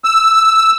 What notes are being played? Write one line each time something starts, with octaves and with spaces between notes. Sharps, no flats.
E6